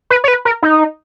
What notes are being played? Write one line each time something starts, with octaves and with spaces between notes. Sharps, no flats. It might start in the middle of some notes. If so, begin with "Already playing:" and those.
B4
C#5
B4
A#4
D#4